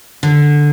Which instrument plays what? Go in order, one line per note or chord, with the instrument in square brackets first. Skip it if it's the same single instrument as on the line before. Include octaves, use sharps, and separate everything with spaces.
[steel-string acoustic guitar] D3